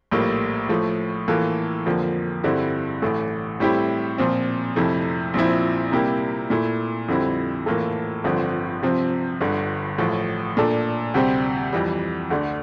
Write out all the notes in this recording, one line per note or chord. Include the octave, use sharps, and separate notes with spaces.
A#1 A2 G3 A#3
A2 F3 A3
A2 E3 A#3 F4 A4
F2 D3 F3 A#3
G2 D3 G3 C4 E4
A1 A2 E3 A3
A2 G3 C4 E4 G4
A#2 F3 C4
F2 C3 F3 A3 E4
A#1 A#2 F3 C4 E4
C3 G3 A#3 E4 G4
A#2 A3 E4
F2 D3 G3 C4 E4
A2 E3 A#3 F4 A4
G1 G2 D3 F3 C4
C3 F3 C4
G1 G2 D3
A1 A2 F3
A#2 A3 D4 A4
D2 C3 G3 C4 G4
F2 E3 G3
D2 D3 A3 D4